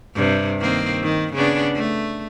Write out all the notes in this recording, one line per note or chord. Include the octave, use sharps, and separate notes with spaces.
G2 C3
D#3 A#3 C4
D#3
C#3 B3 D4
A3